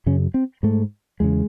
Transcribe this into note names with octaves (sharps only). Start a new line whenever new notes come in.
F#2 C#3 C#4
C4
G#2 A3
E2 C#3 G#3